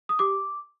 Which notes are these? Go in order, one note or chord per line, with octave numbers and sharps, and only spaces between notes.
D#6
G4 D6